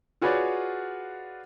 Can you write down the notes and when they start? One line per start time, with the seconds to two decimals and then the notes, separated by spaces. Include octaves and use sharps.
0.22 F4 F#4 G#4 B4 C#5 D5